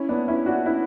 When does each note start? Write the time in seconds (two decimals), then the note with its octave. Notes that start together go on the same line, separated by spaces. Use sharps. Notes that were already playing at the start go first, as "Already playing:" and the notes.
Already playing: C#4 E4
0.09 B3 D4
0.28 C#4 E4
0.46 D4 F#4
0.66 C#4 E4